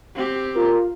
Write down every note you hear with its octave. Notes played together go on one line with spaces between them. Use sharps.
C4 G4
F4 A#4